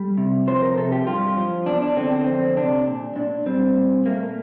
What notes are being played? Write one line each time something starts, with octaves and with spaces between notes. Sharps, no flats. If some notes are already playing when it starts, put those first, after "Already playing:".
Already playing: G3 A4
C3
F3 C5
A#4
C3 A4
G4
G2 F4
F3
E2 D4
D4
D3 C4
C4
F2 C4
C3 D4
A#2
A#2 D4
G3 C4
A#2
A3 A#3